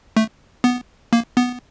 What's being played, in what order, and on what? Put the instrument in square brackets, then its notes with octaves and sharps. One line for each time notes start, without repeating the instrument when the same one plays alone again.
[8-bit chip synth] A3
B3
A#3
B3